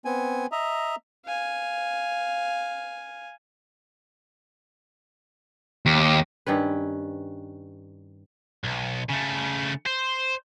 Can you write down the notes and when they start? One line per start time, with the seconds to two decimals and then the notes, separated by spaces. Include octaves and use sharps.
0.05 B3 C4 G#5
0.52 D#5 E5 A#5
1.25 F5 G#5
5.86 D#2
6.47 G2 D#3 C#4 B4
8.64 B1
9.10 C#3 A3
9.86 C5